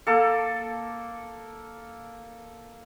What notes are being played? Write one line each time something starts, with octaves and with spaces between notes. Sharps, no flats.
A#3 A4